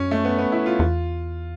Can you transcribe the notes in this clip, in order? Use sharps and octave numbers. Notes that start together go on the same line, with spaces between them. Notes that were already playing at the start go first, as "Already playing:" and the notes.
Already playing: F#2 C#4
A3
B3
B3
E4
F4
E2